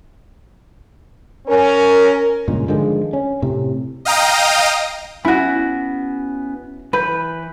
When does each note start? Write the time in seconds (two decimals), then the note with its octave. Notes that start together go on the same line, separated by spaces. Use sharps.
1.47 C#4 A#4
2.48 G2 A#2 C#3 G#3
2.68 D3 D#3 F3 G#3
3.13 C#4
3.42 A2 C3
4.05 D#5 F5 G5 A#5 D#6
5.25 B3 C#4 E4 F#4 B5
6.93 E3 B4 B5 G6